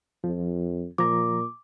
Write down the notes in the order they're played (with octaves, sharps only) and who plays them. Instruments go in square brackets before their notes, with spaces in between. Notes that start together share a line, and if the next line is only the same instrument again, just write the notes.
[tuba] F2 [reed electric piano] F3
[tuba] A#2 [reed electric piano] F3 A#5 [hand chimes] D6